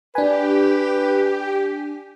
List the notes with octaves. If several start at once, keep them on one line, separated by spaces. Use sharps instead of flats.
D4 G4 B4 G#5